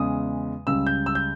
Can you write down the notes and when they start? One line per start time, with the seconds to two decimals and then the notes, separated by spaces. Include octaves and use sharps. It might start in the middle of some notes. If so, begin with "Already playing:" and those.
Already playing: E2 C#3 G#3 D#6
0.67 C#2 C#3 G3 E6
0.86 G6
1.06 E6
1.15 G6